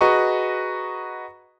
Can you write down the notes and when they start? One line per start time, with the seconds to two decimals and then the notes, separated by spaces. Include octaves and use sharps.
0.01 F#4 G#4 B4 D#5 A#5 C#6